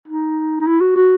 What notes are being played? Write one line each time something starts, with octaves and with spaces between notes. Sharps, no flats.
D#4
D#4
E4
F#4
F#4